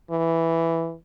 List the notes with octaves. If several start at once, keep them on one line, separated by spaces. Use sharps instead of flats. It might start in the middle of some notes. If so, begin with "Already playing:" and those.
E3